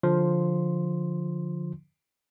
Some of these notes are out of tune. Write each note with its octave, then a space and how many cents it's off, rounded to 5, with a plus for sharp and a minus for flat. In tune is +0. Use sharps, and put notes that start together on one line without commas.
D3 +5 F3 +10 C6 +0